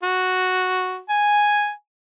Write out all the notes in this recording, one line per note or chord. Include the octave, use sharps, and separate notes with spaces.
F#4
G#5